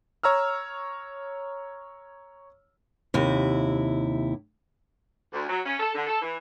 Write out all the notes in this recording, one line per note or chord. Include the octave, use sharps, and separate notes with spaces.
C#5 A#5 E6 F6
D#2 C3 E4
D2
F#3
C#4
A4
D3
A4
E3